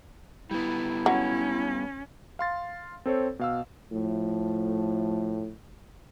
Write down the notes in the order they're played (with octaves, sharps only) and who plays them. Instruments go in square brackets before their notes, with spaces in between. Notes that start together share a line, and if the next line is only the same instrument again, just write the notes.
[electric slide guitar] G3 B3 [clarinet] E4
[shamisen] F#3 [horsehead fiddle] C#4
[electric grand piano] F5 C6 A6
C4 A4 C5 C#5
B2 F5 E6
[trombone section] A2 F3 A3